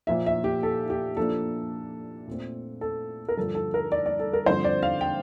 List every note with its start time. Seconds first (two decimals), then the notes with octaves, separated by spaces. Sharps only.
0.07 A#2 F3 A#3 E5
0.26 E5
0.44 G4
0.63 A4
0.90 G4
1.17 A#2 F3 A#3 D4 A4
2.28 A#2 A3 C4
2.81 A4
3.29 A#4
3.37 G2 D3 F3 A4
3.55 A4
3.74 A#4
3.92 D5
4.06 D5
4.19 A4
4.33 A#4
4.46 G2 D3 F3 C4 C5
4.64 D5
4.83 F5
5.01 G5